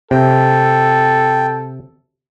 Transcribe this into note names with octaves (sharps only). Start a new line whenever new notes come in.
C3 A4 G5